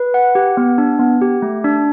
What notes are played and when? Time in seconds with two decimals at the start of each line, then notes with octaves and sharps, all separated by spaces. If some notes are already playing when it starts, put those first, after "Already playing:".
Already playing: B4
0.14 F#5
0.35 G4
0.57 B3
0.78 D4
0.99 B3
1.22 G4
1.42 A3
1.64 D4